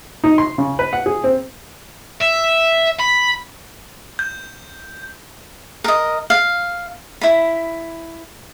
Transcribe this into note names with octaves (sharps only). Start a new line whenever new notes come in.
D#4
C6
C#3
B4
F#5
G#4
C4
E5
B5
G6
A#4 D#5
F5
E4 B5